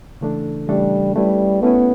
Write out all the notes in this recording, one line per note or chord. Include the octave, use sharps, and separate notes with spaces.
C#3 E3 A3 D4 A4
C#3 E3 G3 A3 D4 A4
G3 A3 C#4 E4 B4
A3 B3 C#4 E4 B4